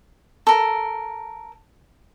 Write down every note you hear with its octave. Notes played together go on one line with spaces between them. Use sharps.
A4 A#4